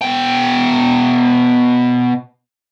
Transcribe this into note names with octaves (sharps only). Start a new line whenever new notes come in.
B2 G5